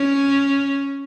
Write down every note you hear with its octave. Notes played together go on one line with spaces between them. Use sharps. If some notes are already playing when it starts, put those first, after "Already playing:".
Already playing: C#4